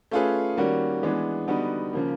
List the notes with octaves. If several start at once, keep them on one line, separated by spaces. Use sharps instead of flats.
A3 C#4 F4 G#4 B4
D#3 G3 A#3 C#4 F#4
E3 G#3 B3 D4
D3 G3 B3 D#4 F#4
C#3 F3 A#3